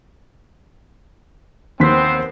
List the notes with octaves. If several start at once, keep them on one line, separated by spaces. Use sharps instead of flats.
D#2 B3 C4 C5 B6